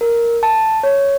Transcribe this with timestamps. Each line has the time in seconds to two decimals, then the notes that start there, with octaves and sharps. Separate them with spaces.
0.01 A#4
0.43 A5
0.83 C#5